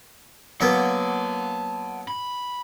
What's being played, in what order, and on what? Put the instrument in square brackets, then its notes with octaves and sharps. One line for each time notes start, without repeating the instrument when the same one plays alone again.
[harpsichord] F#3 A#3 B3 [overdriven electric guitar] F#5 A5
[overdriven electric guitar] B5